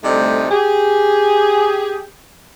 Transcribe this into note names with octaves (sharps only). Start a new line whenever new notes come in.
D2 C3 G3 A3 D#4 D#5
G4 G#4